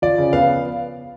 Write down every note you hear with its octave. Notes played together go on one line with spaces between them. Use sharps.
F3 D5
C#3
B3 F5